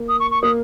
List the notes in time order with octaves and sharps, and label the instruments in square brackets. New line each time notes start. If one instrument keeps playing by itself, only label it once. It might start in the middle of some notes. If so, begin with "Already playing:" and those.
Already playing: [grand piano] A#3
[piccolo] D#6
C#6
C#6
[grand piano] A#3 [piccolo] D#6